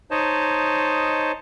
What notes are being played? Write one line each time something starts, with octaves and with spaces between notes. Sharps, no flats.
D#4 C5 C#5 D#5 A5